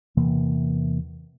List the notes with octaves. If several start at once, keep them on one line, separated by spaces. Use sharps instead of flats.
E2 C3 E3 A#3